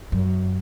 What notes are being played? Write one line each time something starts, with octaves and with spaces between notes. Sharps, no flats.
F#2